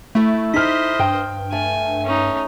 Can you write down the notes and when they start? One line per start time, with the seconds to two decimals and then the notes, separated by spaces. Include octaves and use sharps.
0.15 A3 E4 A4
0.54 D#4 C5 D#5 F6 B6
1.00 G2 G5
1.52 A3 G#5
2.04 C#4 D#4